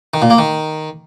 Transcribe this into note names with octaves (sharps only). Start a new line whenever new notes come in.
D#3
A#2
A#3
D#3